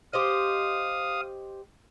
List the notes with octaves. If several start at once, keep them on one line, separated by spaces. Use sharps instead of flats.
G4 C5 D#5 F5 D#6